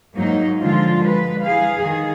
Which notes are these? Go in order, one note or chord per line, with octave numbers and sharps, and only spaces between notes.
G#2 F#3 A#3 D#4
D3 F3 G#3 F4
G#3 B4
E3 G#4 F5
D#3 G#4